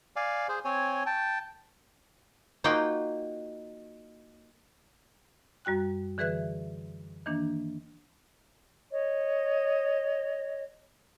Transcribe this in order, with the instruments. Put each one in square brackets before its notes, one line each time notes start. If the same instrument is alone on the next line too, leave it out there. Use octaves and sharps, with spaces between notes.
[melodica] D5 F5 G#5
G#4 C5
C4 C#5 G#5
G5 A5
[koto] A#3 D#4 F4 F#4 G5
[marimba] F#2 G3 F#4 G5 F#6
D3 E3 G#4 B4 E5 F#6
D#3 E3 A#3 D4
[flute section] C#5 D#5